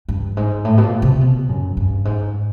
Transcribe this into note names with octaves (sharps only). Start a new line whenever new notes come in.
G2
G#2
A2
B2
A#2
C3
B2
F#2
G2
G#2